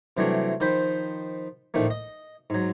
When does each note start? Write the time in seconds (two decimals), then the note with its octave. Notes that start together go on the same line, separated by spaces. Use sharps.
0.17 C3 E3 F#3 G3 A3 D4
0.60 D#3 F3 C5 G5 B5
1.74 A1 A#2 D#3 F3 A3
1.90 D#5
2.50 G#2 F#3